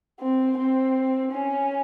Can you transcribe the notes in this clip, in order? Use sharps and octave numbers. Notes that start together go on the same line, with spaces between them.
C4
C4
C#4